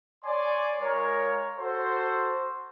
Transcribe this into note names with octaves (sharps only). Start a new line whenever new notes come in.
C#5 D5 G#5 C6 D6
G#3 F4 A#4 C#5 A#5
F#4 A4 C5